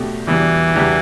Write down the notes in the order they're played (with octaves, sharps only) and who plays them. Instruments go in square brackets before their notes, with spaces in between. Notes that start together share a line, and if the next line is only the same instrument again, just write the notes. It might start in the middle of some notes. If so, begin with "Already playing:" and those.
Already playing: [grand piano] B2 A3 D4 G4
[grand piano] E2 B2 G3 D4 [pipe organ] E3
[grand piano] E2 B2 G3 D4 G4